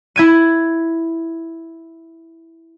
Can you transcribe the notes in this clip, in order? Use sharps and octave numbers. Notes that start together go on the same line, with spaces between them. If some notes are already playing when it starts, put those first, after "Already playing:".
E4 G#6 D#7